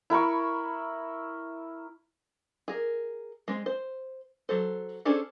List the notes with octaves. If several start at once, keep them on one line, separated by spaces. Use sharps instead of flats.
E4 A#4 B5 C#6
G#4 A#4
G#3 C4
C5
F#3 A4 C5
C#4 D4 G#4 A4 C5